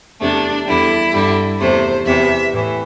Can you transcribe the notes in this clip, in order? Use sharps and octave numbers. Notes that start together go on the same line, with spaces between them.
E2 C3 A3 D4
E2 D3 G3 E4
G2 D3 G3
E2 C3 A3 C5
E2 C3 E3 E5
A2 E3